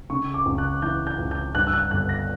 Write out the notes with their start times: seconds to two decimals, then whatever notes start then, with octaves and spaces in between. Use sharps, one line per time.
0.10 C#3 C#6
0.34 D6
0.46 C#2
0.58 F#6
0.82 E3 G6
1.07 G6
1.18 C#2
1.31 G6
1.55 G2 F#6
1.67 E6
1.73 F#6
1.91 G1 F#6
2.09 A#6